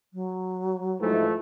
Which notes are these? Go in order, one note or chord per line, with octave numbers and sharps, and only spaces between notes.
F#3
G#2 E3 F3 A3